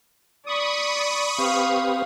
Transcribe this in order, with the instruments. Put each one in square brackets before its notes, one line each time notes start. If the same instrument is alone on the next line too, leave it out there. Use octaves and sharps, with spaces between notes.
[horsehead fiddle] D5 [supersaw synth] B5 C#6 D#6
[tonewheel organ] C4 G4 B4 [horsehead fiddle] F5